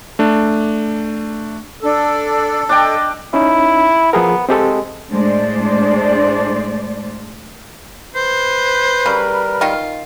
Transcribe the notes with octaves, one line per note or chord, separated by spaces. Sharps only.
A3 D4
D4 A4
D4 D5 D#5 G5
C#4 D#4 E4
F3 B3 G#4 A#4
G#3 C4 G4 A4
A2 G#3 A3 D4 C5 D5
B4 C5
C#3 G3 A#4
D#3 F4